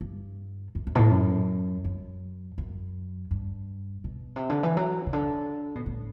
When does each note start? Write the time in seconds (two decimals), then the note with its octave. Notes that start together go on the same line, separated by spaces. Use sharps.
0.01 G2
0.75 F#2
0.87 F#2
0.95 B2
0.98 A2
1.11 F#2
1.84 F#2
2.58 F#2
3.31 G2
4.04 B2
4.36 C3
4.50 D3
4.63 E3
4.77 F#3
5.06 C3
5.13 D3
5.75 B2
5.86 A2